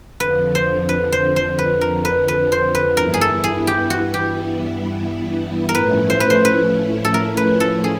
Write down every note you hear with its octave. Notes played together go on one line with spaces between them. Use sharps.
F2 D3 F3 B4
C5
B4
C5
C5
B4
A#4
B4
B4
C5
B4
G2 E3 G3 B3 E4 A#4
G#4
A4
G#4
G4
F#4
G4
A#4
A2 F3 A3 C#4 E4 B4
C5
B4
C5
B4
A4
A#4
B4
A4
G#4